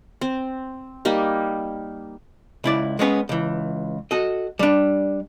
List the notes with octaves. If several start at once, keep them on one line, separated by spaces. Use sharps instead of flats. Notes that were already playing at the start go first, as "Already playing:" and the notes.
C4
G3 A#3 D#4
C#2 E4 D5
G#3 B3 C#4 B4
C#2 E3
F#4 A4 D#5
G3 D4